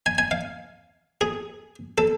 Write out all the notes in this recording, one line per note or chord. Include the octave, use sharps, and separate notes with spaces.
G#5
G#5
F5
G#4
A4